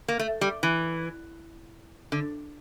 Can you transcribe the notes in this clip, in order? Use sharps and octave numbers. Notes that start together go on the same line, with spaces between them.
A#3
A3
G3
E3
D3